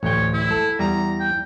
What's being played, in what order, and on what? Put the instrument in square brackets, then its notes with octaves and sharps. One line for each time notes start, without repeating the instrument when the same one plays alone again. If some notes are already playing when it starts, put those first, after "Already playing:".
[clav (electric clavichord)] A1 D2 G5 [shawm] C#5
[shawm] E4
[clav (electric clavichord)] A4
[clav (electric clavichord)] E2 G3 [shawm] A#5
[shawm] G5